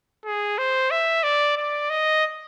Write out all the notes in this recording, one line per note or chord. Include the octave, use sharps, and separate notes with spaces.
G#4
C5
E5
D5
D5
D#5